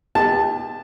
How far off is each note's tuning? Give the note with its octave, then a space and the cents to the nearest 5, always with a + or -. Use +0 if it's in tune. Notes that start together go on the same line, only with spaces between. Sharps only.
G4 +45 A5 +0